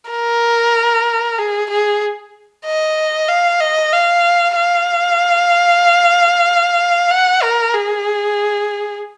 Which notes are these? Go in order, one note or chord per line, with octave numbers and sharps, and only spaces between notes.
A#4
G#4
G#4
D#5
F5
D#5
F5
F5
F#5
A#4
G#4